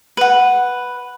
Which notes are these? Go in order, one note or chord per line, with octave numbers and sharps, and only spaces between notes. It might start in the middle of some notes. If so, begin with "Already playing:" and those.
B4 F#5